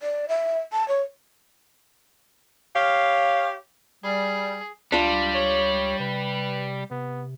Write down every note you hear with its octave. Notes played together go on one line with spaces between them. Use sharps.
D5
E5
A5
C#5
G4 C#5 F5
G3 G#4
C#2 G3 D4 F4
C#5
C3 B4
C3 B3